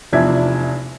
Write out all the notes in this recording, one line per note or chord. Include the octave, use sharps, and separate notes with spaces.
F1 E2 F3 D4 E5 G#6